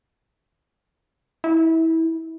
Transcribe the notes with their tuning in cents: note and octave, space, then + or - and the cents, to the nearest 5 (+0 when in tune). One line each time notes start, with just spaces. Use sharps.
E4 -25